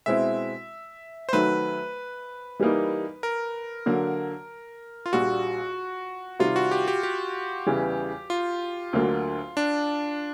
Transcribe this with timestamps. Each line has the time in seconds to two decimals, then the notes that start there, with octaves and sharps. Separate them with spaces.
0.06 B2 G#3 C4 E4 E5
1.29 C5
1.33 D#3 F#3 A3 B4
2.59 E3 G3 A#3 D#4
3.23 A#4
3.86 D3 F#3 A#3
5.06 F4
5.13 A#1 A#2 G3 F#4
6.40 C3 D#3 G3 F4
6.56 F#4
6.71 G4
6.88 G4
7.03 G4
7.66 E2 C#3 E3 G3
8.30 F4
8.93 D2 D3 F#3 A#3
9.57 D4